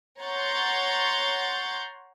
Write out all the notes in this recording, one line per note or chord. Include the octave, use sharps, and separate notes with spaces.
C#5 F#5 A#5 C6 G6 A6